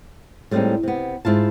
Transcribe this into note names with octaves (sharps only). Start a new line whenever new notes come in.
A2 G3 G#3 A#3 C4 D#4
C3 B3
G#2 E4 F4 A5